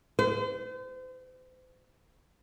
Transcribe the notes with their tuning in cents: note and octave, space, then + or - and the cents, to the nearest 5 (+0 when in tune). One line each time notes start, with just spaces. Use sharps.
C5 -40